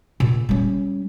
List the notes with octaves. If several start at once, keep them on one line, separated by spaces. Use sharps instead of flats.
A#2
G3 C#4